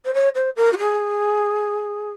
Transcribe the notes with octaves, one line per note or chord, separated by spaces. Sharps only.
C5
C#5
C5
A#4
F#4
G#4